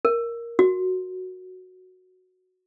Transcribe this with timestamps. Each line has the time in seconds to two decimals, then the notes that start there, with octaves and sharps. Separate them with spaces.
0.05 A#4
0.59 F#4